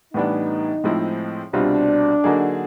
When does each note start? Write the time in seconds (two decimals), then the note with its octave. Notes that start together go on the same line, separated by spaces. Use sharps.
0.14 A2 E3 G3 B3 D4 D#4
0.84 A2 F3 G#3 C4 E4
1.53 C2 B2 G3 C4 D4 F4
2.24 D3 F#3 A#3 D#4 G#4